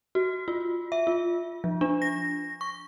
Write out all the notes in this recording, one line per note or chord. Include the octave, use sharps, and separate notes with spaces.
F#4
F4
E5
F4
F3
D4
A#6
C#6